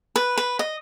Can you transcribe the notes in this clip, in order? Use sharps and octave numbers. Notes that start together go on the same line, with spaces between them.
B4
B4
D#5